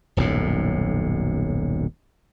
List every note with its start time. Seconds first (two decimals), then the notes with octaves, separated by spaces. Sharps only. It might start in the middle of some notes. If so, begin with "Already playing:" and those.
0.17 D#1 B1 F#2 A2